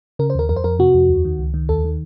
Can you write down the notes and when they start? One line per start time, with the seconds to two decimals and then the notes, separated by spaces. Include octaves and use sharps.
0.19 C#3 A#4
0.30 C5
0.35 D#2 A#4
0.49 F2 A#4
0.56 C5
0.64 F2 A#4
0.79 C3 F#4
0.94 F2
1.09 D#2
1.25 D#3
1.39 C#2
1.54 D#3
1.69 D#2 A4
1.85 D#3